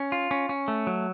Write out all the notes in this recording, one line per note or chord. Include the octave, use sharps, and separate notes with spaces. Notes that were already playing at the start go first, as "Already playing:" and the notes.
Already playing: C#4
F4
C#4
C#4
A3
F#3